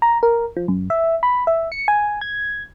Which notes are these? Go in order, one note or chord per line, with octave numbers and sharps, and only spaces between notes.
A#5
A#4
F3
F#2
E5
B5
E5
C#7
G#5
G#6